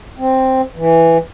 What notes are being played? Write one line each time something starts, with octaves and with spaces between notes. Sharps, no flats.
C4
E3